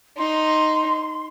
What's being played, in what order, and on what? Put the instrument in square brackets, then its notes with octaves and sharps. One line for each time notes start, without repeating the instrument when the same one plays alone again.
[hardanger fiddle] D#4 [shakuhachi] C6